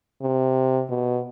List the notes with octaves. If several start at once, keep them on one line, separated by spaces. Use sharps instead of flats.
C3
B2